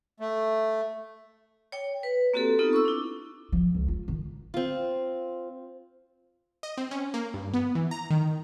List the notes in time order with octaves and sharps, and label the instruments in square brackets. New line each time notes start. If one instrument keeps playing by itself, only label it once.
[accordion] A3
[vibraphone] C#5 G5
B4
A#3 C4 F#4 G4 A4
B3 C4 D#4 F4 A4
C#6 E6
D4 E4
[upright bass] F3
C#2
F4
D#3
[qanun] C4 F4
[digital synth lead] D#5
C4
C#4
A#3
G2
B3
E3
A#5
D#3